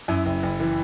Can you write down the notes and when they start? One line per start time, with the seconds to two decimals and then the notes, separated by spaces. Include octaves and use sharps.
0.08 F#2 E4
0.26 F#1
0.43 F#1
0.60 E3